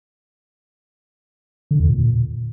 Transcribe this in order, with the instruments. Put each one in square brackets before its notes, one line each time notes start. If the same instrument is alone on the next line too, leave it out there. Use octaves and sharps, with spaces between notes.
[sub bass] D3
E2
A#2